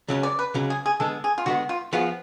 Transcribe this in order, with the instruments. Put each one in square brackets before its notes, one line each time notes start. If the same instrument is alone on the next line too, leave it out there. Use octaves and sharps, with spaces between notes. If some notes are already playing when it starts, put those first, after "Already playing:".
[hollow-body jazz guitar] C#2 C#3 F#3 C#4
[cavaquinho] D5
B4
[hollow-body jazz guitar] C#2 C#3 F#3 C#4
[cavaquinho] G#4
G#4
[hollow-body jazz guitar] D3 G#3 B3 [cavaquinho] A4
[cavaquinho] G#4
F4
[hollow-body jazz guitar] D3 G#3 B3 [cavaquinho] F#4
[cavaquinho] F4
[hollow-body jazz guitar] F3 B3 F4 G#4 [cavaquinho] F#4